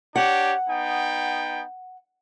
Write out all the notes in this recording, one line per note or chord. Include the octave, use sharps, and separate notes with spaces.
D4 G4 C#5 F#5
B3 D#4 G5